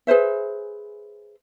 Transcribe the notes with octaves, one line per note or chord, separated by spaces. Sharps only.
G#4 B4 C5 E5